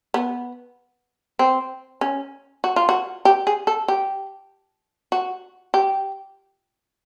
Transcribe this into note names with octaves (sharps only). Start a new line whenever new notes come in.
B3
C4
C#4
F#4
F4
F#4
G4
G#4
A4
G4
F#4
G4